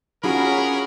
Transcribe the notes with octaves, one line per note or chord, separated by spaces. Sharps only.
C#4 D4 F4 F#4 G#4 A#4 B5